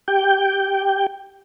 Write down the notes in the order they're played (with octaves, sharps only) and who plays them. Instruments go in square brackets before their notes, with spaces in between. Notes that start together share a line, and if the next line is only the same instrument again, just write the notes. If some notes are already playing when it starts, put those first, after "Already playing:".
[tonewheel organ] G4 G5